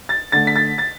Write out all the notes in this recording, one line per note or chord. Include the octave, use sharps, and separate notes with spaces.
A6
D3 A3 A6
B6
A6
A6